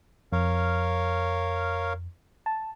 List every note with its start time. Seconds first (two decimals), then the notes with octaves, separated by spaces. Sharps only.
0.32 F2 A#4 C#5 F5
2.46 A5